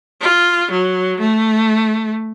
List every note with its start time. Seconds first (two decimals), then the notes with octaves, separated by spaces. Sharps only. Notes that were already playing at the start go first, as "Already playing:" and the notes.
0.21 F4
0.71 F#3
1.20 A3